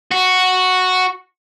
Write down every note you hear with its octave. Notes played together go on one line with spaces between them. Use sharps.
F#4